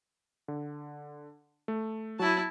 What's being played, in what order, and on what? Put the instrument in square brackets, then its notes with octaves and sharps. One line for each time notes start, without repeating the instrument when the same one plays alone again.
[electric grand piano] D3
A3
[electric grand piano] F#3 F#4 [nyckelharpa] E4 A5